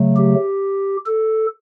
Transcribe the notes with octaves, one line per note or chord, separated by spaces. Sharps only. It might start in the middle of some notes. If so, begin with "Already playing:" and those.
Already playing: C#3 F#3 A3
G4
A4